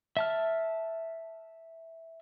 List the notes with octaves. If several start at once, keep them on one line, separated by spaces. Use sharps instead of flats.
E5 A5 F6